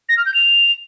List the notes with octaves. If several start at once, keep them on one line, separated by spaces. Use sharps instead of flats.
A#6
F6
G6
F7